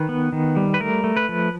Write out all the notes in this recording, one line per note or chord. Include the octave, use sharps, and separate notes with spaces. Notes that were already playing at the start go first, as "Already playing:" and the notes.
Already playing: D#3 B4
B3
D#3
G3
B4
A3 A#4
A3
B4
F3